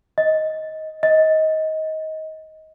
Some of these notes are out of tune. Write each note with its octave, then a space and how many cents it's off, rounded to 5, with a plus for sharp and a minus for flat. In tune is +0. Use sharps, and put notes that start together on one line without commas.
D#5 +15
D#5 +20